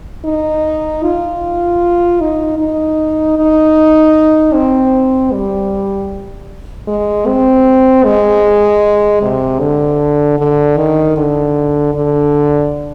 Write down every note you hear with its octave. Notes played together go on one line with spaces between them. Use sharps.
D#4
F4
D#4
D#4
D#4
C4
G3
G#3
C4
G#3
C3
D3
D3
D#3
D3
D3